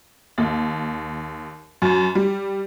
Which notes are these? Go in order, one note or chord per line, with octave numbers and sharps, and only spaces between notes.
D#2
F#2
G3